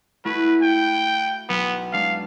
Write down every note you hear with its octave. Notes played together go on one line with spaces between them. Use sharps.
A3 E4 F#4 B4
G5
B1 B3
G#3 D4 F5